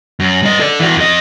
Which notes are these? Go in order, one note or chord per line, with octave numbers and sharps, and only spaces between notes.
F#2
G2 D#5
A4 D5
E3 F#4
F2 D#5